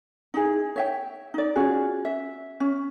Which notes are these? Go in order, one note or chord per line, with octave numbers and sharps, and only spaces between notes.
D#4 E4 G#4
C#5 E5 G5
D#4 D5
C#4 F4 F#4 G#4
E5
C#4